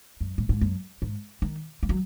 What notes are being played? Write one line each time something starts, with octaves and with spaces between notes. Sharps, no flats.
F#2
A2
G#2
F#2
G#2
D#3
E3
F#3